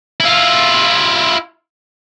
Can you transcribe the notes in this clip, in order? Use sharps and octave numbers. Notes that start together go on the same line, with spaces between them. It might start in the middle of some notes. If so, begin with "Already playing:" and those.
E4 F4